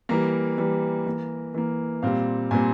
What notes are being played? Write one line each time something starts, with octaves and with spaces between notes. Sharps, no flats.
E3 G3 A#3 A#5
E3 G3 A#3
E3 A#3
E3 A#3
A#2 G3 C4 F5
A#2 G3 C4 G#5